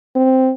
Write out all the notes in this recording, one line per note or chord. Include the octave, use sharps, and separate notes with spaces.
C4